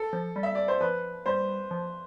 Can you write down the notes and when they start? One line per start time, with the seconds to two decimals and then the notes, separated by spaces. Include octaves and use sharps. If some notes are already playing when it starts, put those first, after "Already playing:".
Already playing: A4
0.13 F3
0.36 G3
0.43 E5
0.55 D5
0.68 C5
0.81 F3 B4
1.26 G3 C5
1.71 F3